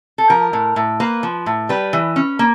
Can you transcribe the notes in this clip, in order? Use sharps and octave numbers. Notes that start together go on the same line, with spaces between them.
A4
F3 A#4
A2
A2
A#3 B4
F3
A2
G3 B4
E3
C#4
A#3